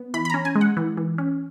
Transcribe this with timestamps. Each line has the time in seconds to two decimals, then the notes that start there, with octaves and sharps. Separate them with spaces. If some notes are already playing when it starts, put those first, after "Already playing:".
Already playing: B3
0.14 E3 B5
0.25 B5
0.30 A#5
0.34 C#4
0.45 G#5
0.55 G#3
0.61 F#5
0.77 E3
0.97 E3
1.18 C#4